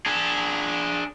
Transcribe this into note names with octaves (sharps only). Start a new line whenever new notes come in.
D4 G#4